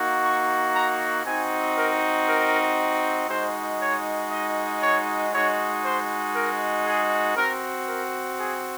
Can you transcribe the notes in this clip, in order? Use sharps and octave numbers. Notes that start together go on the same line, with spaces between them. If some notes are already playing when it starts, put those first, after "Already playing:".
Already playing: A#3 D#4 F#4
C#6
A#5
C4 D#4 F#4 G#5
A#4
A#4
G#3 D#4 F#4 C5
C#5
D#5
C#5
G#3 D#4 F#4 C#5
C5
A#4
G#4
C4 F#4 A#4
A#4
G#4